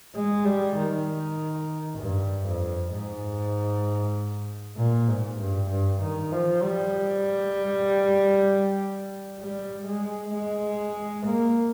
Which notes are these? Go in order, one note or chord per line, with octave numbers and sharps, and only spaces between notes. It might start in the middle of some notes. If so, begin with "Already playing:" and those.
G#3
G3
D#3
G2
F2
G#2
A#2
G#2
G2
G2
D#3
F3
G3
G3
G#3
G#3
A#3